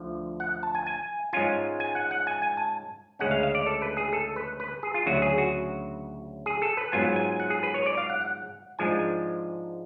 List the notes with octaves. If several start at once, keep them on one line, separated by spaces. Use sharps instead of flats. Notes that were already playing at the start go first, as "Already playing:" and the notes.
Already playing: D2 D3 F3
F#5
A5
G#5
G#5
G#2 G#3 C#4 F4 G#5
G#5
F#5
F#5
G#5
G#5
A5
D2 C#3 G#3 C#4 F#5
F5
F5
D5
A4
B4
G#4
A4
B4
B4
G#4
F4
D2 C#3 F#3 F#4
G#4
F#4
G#4
A4
B4
G#2 F#3 B3 F4 G#5
G#5
F#5
G#4
B4
C#5
D5
F5
F#5
F#5
G#2 F3 G#3 D4 G#5